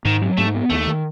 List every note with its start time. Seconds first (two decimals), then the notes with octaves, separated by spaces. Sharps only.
0.05 G#2 D#3
0.22 F#3
0.37 G#2 A3
0.54 B3
0.70 D#2 A3
0.87 D#3